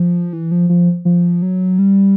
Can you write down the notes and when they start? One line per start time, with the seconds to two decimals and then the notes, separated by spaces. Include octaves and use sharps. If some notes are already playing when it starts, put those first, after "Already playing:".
Already playing: F3
0.33 E3
0.51 F3
0.69 F3
1.05 F3
1.42 F#3
1.79 G3